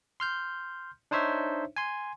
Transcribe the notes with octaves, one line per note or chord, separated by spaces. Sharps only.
C6 F6 G6
D4 D#4 C5 C#5 E5
G#5 C6